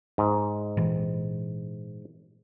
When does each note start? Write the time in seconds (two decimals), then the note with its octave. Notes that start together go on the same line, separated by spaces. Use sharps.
0.18 G#2
0.77 A#2 E3